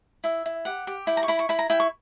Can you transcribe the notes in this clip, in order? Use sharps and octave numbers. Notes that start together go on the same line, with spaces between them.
E4 E5
E4
G4 F#5
G4
E4 G5
A#5
C#6
E4 B5
C#6
E4 B5
A#5
E4 G5
C#6